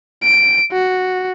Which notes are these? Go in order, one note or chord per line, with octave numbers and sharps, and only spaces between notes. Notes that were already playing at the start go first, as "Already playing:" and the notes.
D7
F#4